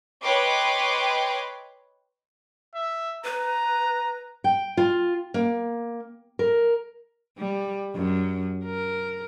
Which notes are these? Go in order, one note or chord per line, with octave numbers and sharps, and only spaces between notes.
B4 C#5 D#5 G5 C6 D6
E5
B4 A#5
G5
F4
A#3
A#4
G3
F#2
A#4